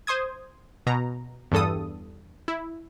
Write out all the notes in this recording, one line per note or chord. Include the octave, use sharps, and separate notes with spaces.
C5 C6 D#6 G#6
B2 A#5
E2 G2 A4 D#6
E4